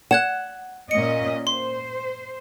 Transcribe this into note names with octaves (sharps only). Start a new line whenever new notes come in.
F#5 F#6 G#6 E7
A#2 C#4 D#5 C#7
C5 C6